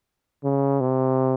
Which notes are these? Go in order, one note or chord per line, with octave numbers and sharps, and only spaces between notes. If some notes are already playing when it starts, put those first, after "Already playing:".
C#3
C3